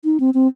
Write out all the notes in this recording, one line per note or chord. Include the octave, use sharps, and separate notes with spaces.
D#4
C4
C4